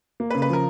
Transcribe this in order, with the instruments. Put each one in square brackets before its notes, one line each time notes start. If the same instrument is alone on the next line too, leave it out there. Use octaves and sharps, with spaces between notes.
[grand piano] A#3
[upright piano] B4
[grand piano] C#3
[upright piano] B4
[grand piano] F3 [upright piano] A#4